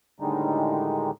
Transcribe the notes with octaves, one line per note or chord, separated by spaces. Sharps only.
A2 D3 D#3 G3 G#3 D#4